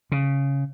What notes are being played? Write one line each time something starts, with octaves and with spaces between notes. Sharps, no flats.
C#3